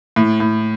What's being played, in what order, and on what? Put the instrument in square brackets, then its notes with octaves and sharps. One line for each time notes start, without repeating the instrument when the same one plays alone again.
[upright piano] A2
A2